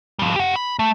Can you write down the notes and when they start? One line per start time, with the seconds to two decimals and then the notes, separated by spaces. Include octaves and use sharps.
0.19 F3 G3
0.36 G4 F#5
0.56 B5
0.79 A3